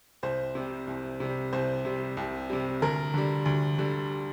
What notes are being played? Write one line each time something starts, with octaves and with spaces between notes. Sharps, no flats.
C2 C5
C3 G3
C2
C3 G3
C2 C5
C3 G3
C2
C3 G3
D2 A#4
D3 G3
D2
D3 G3